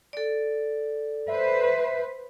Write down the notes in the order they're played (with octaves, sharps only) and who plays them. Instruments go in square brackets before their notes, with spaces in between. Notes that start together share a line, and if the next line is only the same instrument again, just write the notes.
[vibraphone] A4 D5
[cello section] B4 C5 [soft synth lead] E5